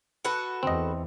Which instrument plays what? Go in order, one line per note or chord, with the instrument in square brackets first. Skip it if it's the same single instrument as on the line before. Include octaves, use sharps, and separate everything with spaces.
[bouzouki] F#4 A4 B4
[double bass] E2 [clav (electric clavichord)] C4 D#5